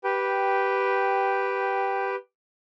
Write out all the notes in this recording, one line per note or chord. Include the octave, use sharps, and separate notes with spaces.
G4 B4 G5